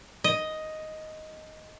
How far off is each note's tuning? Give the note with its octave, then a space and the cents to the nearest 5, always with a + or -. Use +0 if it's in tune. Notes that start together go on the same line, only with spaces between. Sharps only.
D#5 +5